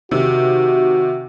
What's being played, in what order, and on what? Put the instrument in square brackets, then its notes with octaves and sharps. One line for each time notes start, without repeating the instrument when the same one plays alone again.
[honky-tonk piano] C3 D#3 [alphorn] F#4